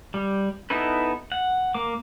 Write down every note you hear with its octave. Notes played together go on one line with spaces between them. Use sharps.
G3
B3 D#4 E4 A4 B4
F#5
A#3 D6